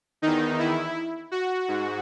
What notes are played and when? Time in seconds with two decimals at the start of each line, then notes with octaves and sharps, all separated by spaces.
0.22 E2 D#3 D#4
0.59 E4
1.31 F#4
1.68 G#2